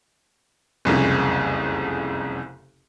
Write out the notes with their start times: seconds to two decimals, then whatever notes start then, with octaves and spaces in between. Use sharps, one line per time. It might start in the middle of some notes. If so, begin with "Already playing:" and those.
0.85 F#1 C2 F2 C#3